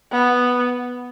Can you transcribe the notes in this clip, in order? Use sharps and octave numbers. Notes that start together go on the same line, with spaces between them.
B3